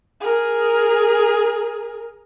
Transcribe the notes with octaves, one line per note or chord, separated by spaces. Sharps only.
G#4 A#4